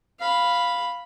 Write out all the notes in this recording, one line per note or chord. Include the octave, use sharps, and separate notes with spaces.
F5 B5